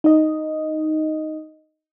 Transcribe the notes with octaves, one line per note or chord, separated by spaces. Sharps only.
D#4 D#5